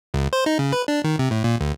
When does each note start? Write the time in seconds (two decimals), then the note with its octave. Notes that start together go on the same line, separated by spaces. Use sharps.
0.14 C#2
0.33 C5
0.46 D#4
0.59 C#3
0.73 B4
0.88 D4
1.04 D#3
1.19 C3
1.31 A2
1.44 A#2
1.61 D2